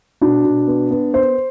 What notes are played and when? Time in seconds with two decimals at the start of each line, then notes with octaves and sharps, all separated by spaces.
0.21 B2 D4
0.45 B2
0.67 B3
0.90 B3
1.13 B3 C5